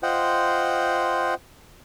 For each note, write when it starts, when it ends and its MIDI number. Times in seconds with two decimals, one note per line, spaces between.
0.03 1.34 65
0.03 1.34 72
0.03 1.34 75
0.03 1.34 78
0.03 1.34 79